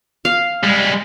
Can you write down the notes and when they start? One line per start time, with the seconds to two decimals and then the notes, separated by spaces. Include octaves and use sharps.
0.25 F5
0.63 G3 G#3